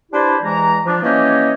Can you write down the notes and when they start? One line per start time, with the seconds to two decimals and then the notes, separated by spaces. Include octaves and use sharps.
0.12 D4 E4 G4 B4 C5 D5
0.43 E2 E3 G#3 A#5
0.85 F3 D4
1.03 E3 A#3 C#4 G4 C#5 D#5